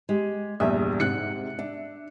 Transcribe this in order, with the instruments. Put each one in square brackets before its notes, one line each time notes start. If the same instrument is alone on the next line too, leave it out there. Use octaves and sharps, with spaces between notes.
[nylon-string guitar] G#3 G4
[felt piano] A#1 E2 G2 [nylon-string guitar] E5 [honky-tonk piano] D#6
[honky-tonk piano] G#2 C3 [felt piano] F#6 C#7
[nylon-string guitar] D4 [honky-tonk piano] E5